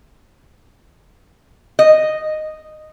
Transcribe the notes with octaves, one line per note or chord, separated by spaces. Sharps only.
D#5